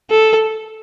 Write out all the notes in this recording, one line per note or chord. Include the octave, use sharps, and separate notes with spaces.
A4